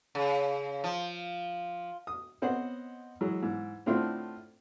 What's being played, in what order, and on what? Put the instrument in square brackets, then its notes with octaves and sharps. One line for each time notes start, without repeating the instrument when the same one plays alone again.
[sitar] C#3
F3
[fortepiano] D#6
B3 C4 C5 C#5 D#5 F#5
E3 F#3 G#3
G#2 E3
A2 D3 C4 E4 F4